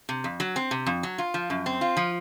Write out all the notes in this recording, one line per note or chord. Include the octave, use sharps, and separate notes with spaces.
C3
F2
F#3
C4
C3
F2
F#3
F4
F3
F#2
C4
F4
F3